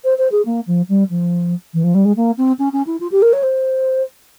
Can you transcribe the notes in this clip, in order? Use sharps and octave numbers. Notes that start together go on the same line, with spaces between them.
C5
C5
G#4
A#3
F3
G3
F3
E3
F3
G3
G#3
A#3
C4
C#4
C#4
E4
F4
G4
A#4
C#5
C5